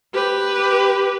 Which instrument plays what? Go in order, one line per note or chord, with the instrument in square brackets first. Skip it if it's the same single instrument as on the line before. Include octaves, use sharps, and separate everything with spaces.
[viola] G4 B4